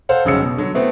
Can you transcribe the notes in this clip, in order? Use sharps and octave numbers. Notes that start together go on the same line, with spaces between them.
A4 C5 F5 F#5
F1 C#3 F#3 E6 C#7
B2
D3 F#3
A3 B3 C4 E4